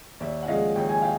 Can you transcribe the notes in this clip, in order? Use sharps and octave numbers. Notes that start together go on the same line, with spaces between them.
D#2 D5 E5
F#5
C#3 F3 G#3 D#5 F5
D#2 G5
G#5
F5 G5